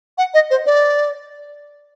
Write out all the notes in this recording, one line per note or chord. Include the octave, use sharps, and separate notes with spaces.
F#5
D#5
C5
D5